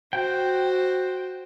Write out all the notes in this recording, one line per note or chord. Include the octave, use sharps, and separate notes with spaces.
F#4 C5 G5